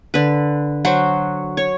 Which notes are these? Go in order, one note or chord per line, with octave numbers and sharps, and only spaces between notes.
D3 B4
F#3 F#4 C5
C#5